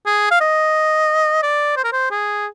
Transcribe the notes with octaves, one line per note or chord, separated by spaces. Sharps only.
G#4
F5
D#5
D5
C5
A#4
C5
G#4